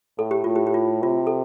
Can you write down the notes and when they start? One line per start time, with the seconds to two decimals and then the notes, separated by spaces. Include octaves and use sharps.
0.18 A2 A4
0.31 G4
0.44 A2 F4
0.56 G4
0.67 G4
0.74 F4
1.02 C3 F4
1.27 A4